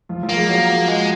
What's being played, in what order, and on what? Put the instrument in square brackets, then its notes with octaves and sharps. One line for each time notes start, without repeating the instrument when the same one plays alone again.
[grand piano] F3 F4
F3 F4
[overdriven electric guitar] A#3
[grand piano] G#3 G#4
F#3 F#4
[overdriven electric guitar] G#3